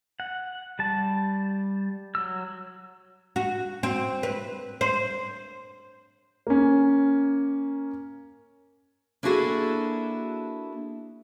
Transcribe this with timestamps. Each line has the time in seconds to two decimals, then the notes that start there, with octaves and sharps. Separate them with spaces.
0.20 F#5
0.79 G3 A5
2.15 F#3 E6
3.36 F#4
3.83 C4
4.23 B4
4.81 C5
6.47 A#3 C#4
9.23 A#3 D4 E4 F#4 G#4 A4